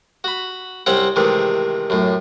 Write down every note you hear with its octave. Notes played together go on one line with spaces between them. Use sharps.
F#4 B5
C2 C4 C#4 C#5 F#5
C3 D#3 E3 G#3 A3
F#2 A2